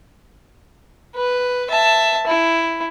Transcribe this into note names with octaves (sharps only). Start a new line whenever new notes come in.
B4
E5 A5
E4